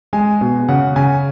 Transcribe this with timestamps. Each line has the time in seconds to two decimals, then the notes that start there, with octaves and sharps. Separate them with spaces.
0.13 G#3 G#5
0.41 B2
0.68 C#3 F#5
0.96 C#3 G#5